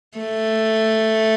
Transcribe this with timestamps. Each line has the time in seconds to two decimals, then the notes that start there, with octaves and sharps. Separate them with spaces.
0.18 A3